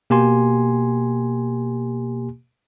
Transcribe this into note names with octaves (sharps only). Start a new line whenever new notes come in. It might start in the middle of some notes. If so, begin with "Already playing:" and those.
B2 A#3 G4 G#5 C6